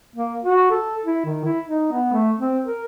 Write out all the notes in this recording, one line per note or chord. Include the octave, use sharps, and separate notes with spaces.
A#3
F#4
A4
E4
D#3
E4
D#4
B3
A3
C4
A#4